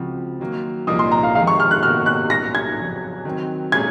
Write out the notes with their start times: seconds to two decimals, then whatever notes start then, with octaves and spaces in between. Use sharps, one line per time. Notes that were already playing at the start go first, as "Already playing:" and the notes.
Already playing: C#2 C#3 F3 C4 F#4
0.40 D#3 F#3 A#3
0.87 C2 A#2 F3 A#3 D#4 D#6
0.99 C6
1.12 A#5
1.23 F5
1.35 F2 D#3 G#3 F5
1.47 C#6
1.60 F6
1.71 F#6
1.83 C3 D#3 A#3 D#4 F#4 F6
2.06 F#6
2.30 C2 A#2 F#3 C#4 A#6
2.55 G#6
2.78 F2 C#3 F#3 C#4
3.25 D#3 F#3 C4
3.72 A#2 G#3 C#4 F4 G#4 G#6